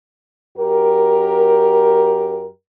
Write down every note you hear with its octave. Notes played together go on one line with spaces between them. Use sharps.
F#2 G4 A#4